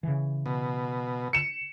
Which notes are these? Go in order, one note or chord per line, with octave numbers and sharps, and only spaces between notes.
C#3 E3
B2
C#7 E7